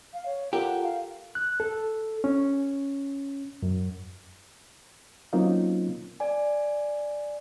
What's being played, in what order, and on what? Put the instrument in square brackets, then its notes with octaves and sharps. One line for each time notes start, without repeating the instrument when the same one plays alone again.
[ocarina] F5
C#5
[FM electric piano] F4 A4 A#4 [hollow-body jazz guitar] G4 [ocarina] F#5
[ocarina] F5
[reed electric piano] F#6
A4
C#4
F#2
F#3 A#3 C4 C#4 D#4 F4
[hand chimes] D5 G#5